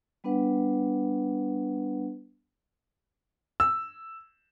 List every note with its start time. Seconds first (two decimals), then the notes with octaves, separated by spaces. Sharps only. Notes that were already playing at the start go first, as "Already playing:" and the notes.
0.24 G3 B3 D4 B4 F#5
3.60 E6